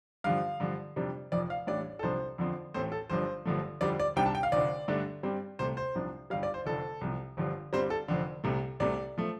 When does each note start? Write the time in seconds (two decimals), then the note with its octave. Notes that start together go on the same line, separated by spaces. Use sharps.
0.24 G2 D3 F3 F5
0.60 G2 D3 F3
0.96 F2 C3 G3 D4
1.32 F1 F2 F3 D5
1.50 F5
1.67 A1 A2 G3 D4 D5
1.99 A4
2.03 C2 C3 F3 D4 C5
2.38 F2 D3 F3 C4
2.74 A1 A2 A3 C4 C5
2.92 A4
3.10 G1 G2 F3 D4 C5
3.45 G1 G2 D3 F3 A3
3.81 F2 D3 G3 D5
4.00 D5
4.16 C2 C3 G3 D4 G5
4.26 A5
4.35 G5
4.43 F5
4.52 F1 F2 D3 D5
4.88 G2 D3 A3 D4
5.23 G2 G3 C4
5.59 C2 C3 A3 C5
5.77 C5
5.95 C2 C3 F3 D4
6.30 G1 G2 G3 F5
6.43 D5
6.54 C5
6.66 F1 F2 D3 A4
7.01 C2 C3 F3
7.37 G1 G2 D3 F3
7.73 G1 G2 G3 C4 C5
7.90 A4
8.08 F1 F2 D3
8.44 C2 C3 A3
8.80 C2 C3 A3 D5
9.18 F3 A3